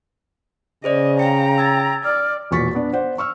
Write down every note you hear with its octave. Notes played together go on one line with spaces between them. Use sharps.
C#3 G#4 C5 D5 D#5
F5 G5 A#5 C#7
E6 G#6 A6
D5 F6
E1 E2 A#2 C#6 A6 B6
B3 D4
C5 D5 F#5
C#6 E6 F6